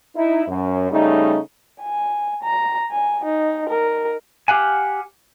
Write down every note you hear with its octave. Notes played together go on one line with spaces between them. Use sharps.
D#4 E4
F#2
C#3 G3 A3 D#4
G#5
A#5
G#5
D#4
A#4
G4 F5 F#5 G#5